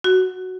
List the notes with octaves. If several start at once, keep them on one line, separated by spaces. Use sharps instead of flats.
F#4